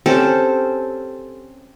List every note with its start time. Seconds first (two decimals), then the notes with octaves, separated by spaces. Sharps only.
0.06 C4 C#4 G4 A4